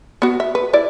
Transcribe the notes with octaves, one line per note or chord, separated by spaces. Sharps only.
B3 F#4
E5
B4
E4 D5